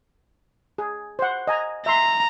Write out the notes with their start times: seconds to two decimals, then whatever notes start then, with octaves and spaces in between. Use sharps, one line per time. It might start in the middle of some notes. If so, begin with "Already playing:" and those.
0.78 G#4
1.19 C5 F#5
1.47 D#5 G#5 A#5
1.86 E5 A#5 C6